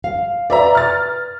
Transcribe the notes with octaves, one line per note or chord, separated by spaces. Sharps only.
F5
B4 D5 E5 A#5
F6 A6